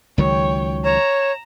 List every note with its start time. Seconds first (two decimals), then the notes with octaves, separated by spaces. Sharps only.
0.18 C#2 D#3 F#3 C#5 G5
0.84 C#5 A#5 E7